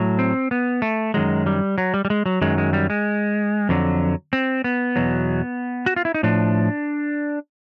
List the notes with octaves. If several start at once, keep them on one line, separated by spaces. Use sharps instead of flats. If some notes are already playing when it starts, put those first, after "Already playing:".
Already playing: A2 F#3
C4
B3
A3
F#2 D#3 F#3 G#3
G3
F#3
G3
G3
G#3
F#3
F#2 D#3 F#3 G#3
G#3
G3
G#3
F2 D3 F#3
C4
B3
E2 B2 F#3
F#4
F4
E4
D#4
A2 F3 D4